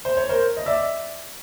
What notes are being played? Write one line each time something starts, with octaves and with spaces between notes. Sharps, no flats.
C5
C#5
A#4 C5
D#5
D5 E5